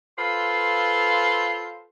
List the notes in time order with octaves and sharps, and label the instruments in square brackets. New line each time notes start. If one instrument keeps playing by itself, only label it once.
[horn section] F4 A4 B4 C5 F5 C6